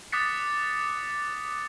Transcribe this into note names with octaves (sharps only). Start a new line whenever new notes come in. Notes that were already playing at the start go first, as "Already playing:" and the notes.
D6 D#6 F#6 A6 B6 C#7